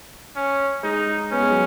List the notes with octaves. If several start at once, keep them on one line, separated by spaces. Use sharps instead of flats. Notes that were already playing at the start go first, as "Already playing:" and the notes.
C#4
G#3 D#4
B3 C#4
G#3
F#3